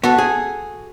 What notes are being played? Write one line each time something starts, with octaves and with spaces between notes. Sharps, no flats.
B3 F#4 A4
G#4